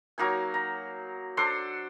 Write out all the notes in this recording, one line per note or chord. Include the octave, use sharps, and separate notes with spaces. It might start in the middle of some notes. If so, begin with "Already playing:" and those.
F#3 A#3 D#4 G#5
A#5
D4 A4 C5 C6